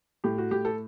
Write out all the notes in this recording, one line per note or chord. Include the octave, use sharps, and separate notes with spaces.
A2 G4
F#4
A2 G4
A4